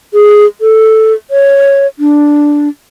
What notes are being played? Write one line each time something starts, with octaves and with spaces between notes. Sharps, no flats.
G#4
A4
C#5
D4